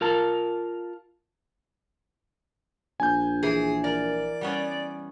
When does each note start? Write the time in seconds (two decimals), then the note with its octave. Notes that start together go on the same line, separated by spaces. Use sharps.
0.01 F4 A#4 A5
3.00 A#1 G#5 G6
3.43 E3 G#4
3.84 A#4 D5
4.41 G3 B3 C#4